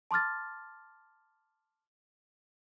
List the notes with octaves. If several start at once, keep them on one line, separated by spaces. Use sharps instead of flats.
A5 C6 D6 F6 A6